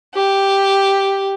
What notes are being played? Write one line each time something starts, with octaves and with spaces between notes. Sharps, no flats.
G4